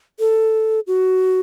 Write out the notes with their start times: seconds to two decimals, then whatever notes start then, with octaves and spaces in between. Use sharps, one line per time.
0.19 A4
0.87 F#4